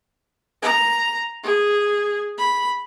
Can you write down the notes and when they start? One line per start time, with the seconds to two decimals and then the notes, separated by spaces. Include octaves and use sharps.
0.62 A#5
1.43 G#4
2.38 B5